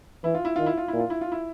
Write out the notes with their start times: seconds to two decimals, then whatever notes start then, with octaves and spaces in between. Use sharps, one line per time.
0.24 E3 E4
0.34 F4
0.45 E4
0.56 D#3 F4
0.66 E4
0.77 F4
0.88 A#2 E4
0.99 F4
1.10 E4
1.21 F4
1.32 E4